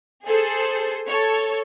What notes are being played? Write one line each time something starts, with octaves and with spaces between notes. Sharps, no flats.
G#4 A4 C5
A4 C#5